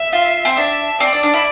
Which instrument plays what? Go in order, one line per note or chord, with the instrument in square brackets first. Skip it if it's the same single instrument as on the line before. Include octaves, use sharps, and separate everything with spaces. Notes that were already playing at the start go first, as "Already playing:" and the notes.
Already playing: [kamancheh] E5
[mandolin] F4
C4
[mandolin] D4 [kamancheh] E5
[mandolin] C4 [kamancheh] D5
[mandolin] D4
D4
E4